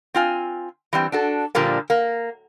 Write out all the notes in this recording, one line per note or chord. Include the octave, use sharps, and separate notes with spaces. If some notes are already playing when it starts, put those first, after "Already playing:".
C4 F4 G#5
E3 G3 C4
D4 F#4 A4
A#2 D3 F3 G3 A#3
A#3